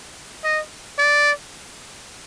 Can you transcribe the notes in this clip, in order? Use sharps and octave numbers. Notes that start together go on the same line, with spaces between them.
D#5
D5